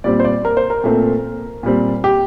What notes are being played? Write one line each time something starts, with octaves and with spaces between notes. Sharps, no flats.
A#2 G3 C4 D5
C5
D5
A#4
C5
A#4
A#2 A3 C4
A#2 G3 C4
G4